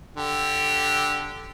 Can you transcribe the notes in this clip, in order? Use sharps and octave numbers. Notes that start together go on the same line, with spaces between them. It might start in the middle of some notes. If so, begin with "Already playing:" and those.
D3 G4